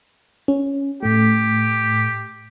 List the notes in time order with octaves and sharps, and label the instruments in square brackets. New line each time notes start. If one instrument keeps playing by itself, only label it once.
[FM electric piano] C#4
[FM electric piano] A2 A3 [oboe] G4